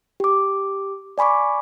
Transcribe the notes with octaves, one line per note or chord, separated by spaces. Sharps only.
G4 D6
D5 G#5 B5 C#6 D6